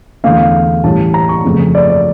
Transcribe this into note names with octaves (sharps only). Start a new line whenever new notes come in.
E2 D3 A3 C#4 F5
A2 E3 G3 C#4 A5
A#5
C#6
F2 C#3 F3 A3
D5
D5